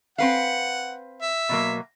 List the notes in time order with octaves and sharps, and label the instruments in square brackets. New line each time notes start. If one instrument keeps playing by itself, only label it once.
[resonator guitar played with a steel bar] C4 B4 F5 [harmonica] F#5
[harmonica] E5
[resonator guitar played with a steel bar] B2 F#3 A#3